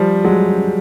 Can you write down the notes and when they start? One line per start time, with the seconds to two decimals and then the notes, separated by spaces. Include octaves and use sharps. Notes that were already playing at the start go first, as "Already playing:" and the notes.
Already playing: F3 G3
0.25 F#3 G#3